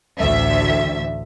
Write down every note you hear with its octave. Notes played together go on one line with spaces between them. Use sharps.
A1 D2 E5